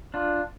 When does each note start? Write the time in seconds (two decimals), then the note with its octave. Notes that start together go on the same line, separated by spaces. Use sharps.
0.14 D4 F4